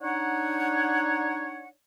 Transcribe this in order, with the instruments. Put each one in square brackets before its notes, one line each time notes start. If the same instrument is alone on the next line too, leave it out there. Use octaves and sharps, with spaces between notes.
[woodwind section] D4 D#4 C#5 F#5